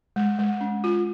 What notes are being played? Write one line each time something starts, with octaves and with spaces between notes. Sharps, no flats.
G#3
G#3
C#4
F4